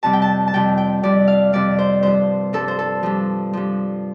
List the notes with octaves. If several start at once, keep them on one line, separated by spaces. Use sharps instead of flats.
F2 C3 G3 A5
G5
A5
A5
F2 C3 G3 G5
G5
F2 C3 G3 D5
F5
F2 C3 G3 D5
C5
G2 F3 C5
G2 F3 A4
C5
A4
G2 F3
G2 F3